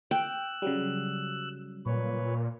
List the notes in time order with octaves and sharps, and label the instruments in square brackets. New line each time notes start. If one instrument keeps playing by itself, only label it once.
[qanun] G5 [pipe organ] E6 F#6
[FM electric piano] C#3 F#3 G3
[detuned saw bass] A#2 [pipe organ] B4 C#5